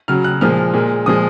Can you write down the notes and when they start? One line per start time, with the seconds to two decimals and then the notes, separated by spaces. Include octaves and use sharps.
0.08 C#3 F#3 F6
0.24 F#6
0.41 A#2 F3 G#3 F6
0.74 A#2 G#3
1.06 A#2 F3 G#3 D#6